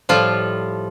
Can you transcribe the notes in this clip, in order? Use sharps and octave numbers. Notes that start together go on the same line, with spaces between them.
A2 F3 G3 F4